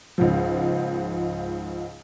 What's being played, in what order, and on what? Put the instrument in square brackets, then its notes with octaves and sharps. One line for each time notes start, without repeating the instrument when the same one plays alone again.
[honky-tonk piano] C#2 G#2 F3